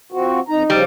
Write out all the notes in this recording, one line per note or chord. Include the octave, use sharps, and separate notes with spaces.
F3 C4 F#4
F2 D#4 A#5
C#3 F3 G3